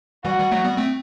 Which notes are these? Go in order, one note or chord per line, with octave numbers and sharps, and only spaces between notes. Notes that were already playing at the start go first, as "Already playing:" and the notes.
E3 G3 F#4
E3 G3
F#3 A3
G3 B3
A3 C4